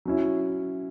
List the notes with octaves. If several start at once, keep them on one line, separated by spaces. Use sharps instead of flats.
F#3 C#4 E4